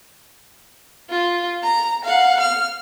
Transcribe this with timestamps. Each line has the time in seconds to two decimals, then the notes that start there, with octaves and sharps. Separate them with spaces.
1.10 F4
1.63 A#5
2.05 F5 F#5
2.40 F6